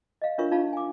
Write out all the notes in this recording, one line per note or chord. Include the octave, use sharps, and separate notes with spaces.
D#5 F5
D4 F4 A#4 C#5 E5 C#6
D4 D#4 F4 F5 A5
G#5 D6